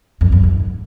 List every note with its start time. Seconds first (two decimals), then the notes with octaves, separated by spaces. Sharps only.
0.21 F2
0.32 F#2
0.43 G#2